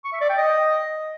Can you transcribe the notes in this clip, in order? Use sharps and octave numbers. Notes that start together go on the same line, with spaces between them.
C#6
E5
D5
G5
D#5